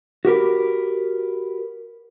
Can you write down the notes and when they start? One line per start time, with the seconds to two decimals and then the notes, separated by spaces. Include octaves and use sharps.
0.25 F#4 G4 A#4 B4